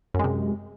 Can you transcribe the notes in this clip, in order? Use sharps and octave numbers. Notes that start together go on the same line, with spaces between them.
F#2 C3 G#3